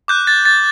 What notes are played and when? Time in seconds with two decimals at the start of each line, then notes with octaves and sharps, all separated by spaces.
0.08 D6 F#6 G6
0.27 A6
0.45 A6